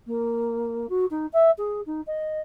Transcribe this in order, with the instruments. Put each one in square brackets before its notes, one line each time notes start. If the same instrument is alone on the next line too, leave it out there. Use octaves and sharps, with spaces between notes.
[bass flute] A#3
F#4
D#4
E5
G#4
D#4
D#5